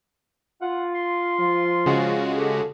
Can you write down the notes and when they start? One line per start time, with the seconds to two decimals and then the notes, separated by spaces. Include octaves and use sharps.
0.61 F4 F#5
0.95 C6
1.39 F3
1.86 C#3 G#3 F#4
2.37 G4 A4